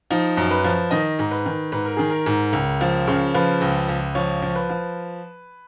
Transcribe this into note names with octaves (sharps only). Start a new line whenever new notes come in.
F3 D#4
F#2
B4
F3
D#3 D#5
G#2
B4
D#3
G#2 B4
A#4
D#3 G#4
A#4
G#2
C#2
F3
C#3
F3 B4
C#2
C#2
F3 C#5
F3
B4
F3